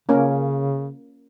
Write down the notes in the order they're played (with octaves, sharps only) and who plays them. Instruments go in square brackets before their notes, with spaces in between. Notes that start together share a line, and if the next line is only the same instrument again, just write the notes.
[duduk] C#3 [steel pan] A#3 C#4 A#4